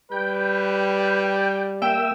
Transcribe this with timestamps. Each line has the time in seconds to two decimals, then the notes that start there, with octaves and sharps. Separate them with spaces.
0.12 G3 B4 G5
1.82 A#3 E5 G5 E6